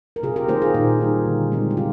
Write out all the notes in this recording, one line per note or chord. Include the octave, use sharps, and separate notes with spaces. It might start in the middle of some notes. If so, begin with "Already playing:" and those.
A#4
C3 F4 G#4
G4 A#4
D#3 A#3 D#4 G#4 C5
F4 G#4
A#2 D#4
G3 A#3 D#4
D3
G#3 C4 D#4
G4
C3 F4